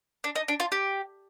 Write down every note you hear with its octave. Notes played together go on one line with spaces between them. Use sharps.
D4
D#4
D4
F4
G4